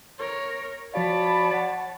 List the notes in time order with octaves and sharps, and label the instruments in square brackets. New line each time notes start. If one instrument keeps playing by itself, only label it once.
[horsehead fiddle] A#4 C#5
[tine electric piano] F3 F#4 F5 [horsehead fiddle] C#5 A5 [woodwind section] D5 B5
[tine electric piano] F#5